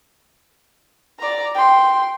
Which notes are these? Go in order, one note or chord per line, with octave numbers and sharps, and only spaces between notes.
D5 A#5
G5 C6